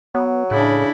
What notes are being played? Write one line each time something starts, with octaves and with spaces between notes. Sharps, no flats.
F#3 B3
A2 C#3 D4 E4